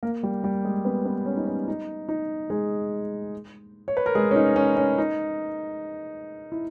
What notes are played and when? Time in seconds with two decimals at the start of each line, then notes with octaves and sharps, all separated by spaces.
0.03 A#3 A#4
0.23 G3 G4
0.44 G3 G4
0.65 G#3 G#4
0.85 B3 B4
1.05 B3 B4
1.26 C#4
1.37 D#4
1.47 C#4
1.68 D#4
2.09 D#4
2.50 G#3 G#4
3.88 C#5
3.97 B4
4.06 A#4
4.15 G#3 G#4
4.31 C#4
4.36 D#4
4.56 C#4
4.77 C#4
4.98 D#4
6.52 E4